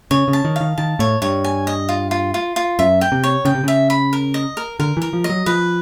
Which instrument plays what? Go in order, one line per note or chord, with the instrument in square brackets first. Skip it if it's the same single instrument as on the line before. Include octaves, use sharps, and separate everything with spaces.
[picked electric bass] C#3 [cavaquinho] C#5
[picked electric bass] C#3
[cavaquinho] A5
[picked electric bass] D#3
[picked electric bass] D#3 [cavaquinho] F5
[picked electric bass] D#3 [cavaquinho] A5
[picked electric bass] A2 [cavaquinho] C#5
[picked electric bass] G2 [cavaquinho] C#5
[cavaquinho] G#5
D#5
F4
F4
F4
F4
[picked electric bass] F#2 [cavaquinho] E5
[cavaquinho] G5
[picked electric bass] C3
[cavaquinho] C#5
[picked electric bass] C#3 [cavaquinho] G5
[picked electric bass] C3
[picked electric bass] C#3 [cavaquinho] E5
[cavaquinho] B5
A#4
D#5
A#4
[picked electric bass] D3 [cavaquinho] A#4
[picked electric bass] E3 [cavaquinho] A#4
[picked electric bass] F3
[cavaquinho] D#5
[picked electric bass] F#3
[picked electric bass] F3 [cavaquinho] B4